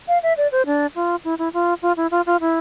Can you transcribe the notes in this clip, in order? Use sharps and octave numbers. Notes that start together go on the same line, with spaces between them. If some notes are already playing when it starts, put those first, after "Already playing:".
F5
E5
D5
C5
D4
F4
E4
E4
F4
F4
E4
F4
F4
E4